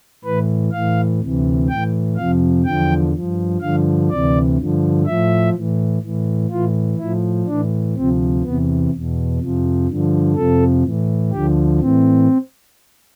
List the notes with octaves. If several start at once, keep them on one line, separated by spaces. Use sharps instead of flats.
A2 E3 B4
A2 E3 F5
D2 C3 E3
A2 E3 G5
F2 C3 F3 F5
E2 D3 F3 G5
G2 F3
G2 D3 F3 F5
D2 C3 E3 D5
G2 D3 F3
A2 F3 E5
A2 E3
A2 E3
A2 E3 F4
A2 F3 E4
A2 E3 D4
D2 C3 F3 C4
E2 C3 E3 B3
E2 B2
F2 C3 F3
G2 D3 F3
F2 C3 F3 A4
A2 E3
D2 D3 F3 G4
A2 E3 C4